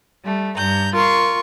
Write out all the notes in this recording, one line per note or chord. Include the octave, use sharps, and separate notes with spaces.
G3 A3
G2 A#5 G6
F4 A#4 C6 C#6